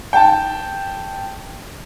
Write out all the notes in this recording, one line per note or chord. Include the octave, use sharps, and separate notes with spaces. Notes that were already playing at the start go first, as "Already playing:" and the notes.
G5 A5